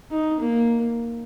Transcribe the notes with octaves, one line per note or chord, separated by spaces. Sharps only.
D#4
A#3